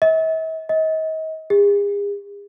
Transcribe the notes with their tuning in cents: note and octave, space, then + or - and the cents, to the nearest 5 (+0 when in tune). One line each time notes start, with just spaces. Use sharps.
E5 -45
D#5 +35
G#4 -40